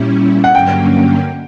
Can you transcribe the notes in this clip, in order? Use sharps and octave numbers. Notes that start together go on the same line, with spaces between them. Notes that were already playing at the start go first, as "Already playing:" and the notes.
Already playing: A#2 G3 C#4 E4
F#5
G2 D3 F#3 A#3 C#4 G5